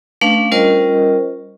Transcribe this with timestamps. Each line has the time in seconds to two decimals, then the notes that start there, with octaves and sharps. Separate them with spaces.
0.21 A3 C#4 D4 B4 F5
0.52 G3 C#4 F4 A#4 C5 D#5